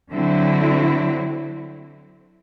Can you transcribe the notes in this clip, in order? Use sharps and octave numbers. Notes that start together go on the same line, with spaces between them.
D3 F#3 C4 E4